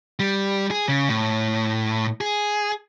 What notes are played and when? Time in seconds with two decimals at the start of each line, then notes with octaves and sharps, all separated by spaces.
0.19 G3
0.71 G#4
0.88 C#3
1.09 A2
2.21 G#4